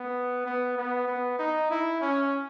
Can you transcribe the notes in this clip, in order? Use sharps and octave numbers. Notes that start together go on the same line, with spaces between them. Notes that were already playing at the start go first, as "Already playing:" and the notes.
Already playing: B3
B3
B3
B3
D#4
E4
C#4